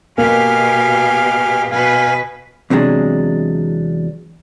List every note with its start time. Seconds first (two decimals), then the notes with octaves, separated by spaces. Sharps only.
0.18 B2 A#3 G4 F5 G#5 F6
1.71 B2 B4 F5 G#5
2.70 E2 C3 F#3 G#3 D4